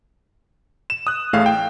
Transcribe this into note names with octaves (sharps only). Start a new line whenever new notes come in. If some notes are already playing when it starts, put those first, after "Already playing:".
E7
D#6 F#6
A1 A2 A3 G#4 F5
G5